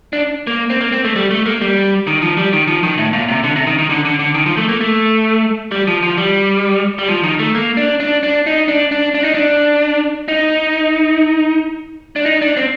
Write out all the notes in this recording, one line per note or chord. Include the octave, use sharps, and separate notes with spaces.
D4
A#3
C4
A#3
C4
A3
G3
A3
A#3
G3
D#3
F3
G3
D#3
F3
D#3
A2
A#2
C3
D3
C3
D#3
D#3
D3
D3
D3
D#3
F3
A3
A#3
A3
G3
F3
F3
G3
G3
F3
D#3
A3
A#3
D4
D4
D4
D#4
D4
D4
D4
D#4
D4
D#4
D4
D#4
D4
C4